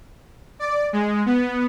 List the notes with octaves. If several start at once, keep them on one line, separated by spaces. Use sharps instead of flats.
D5
G#3
B3